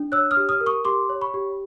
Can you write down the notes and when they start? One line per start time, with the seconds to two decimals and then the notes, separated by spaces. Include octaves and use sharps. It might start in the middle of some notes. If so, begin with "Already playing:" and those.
Already playing: D4
0.12 C#5 E6 F#6
0.31 D#6 F6
0.37 G4
0.49 D#6 F6
0.61 A#4
0.66 C#6 D#6
0.85 G4 C6 D6
1.09 C#5
1.21 B5 C#6
1.34 G4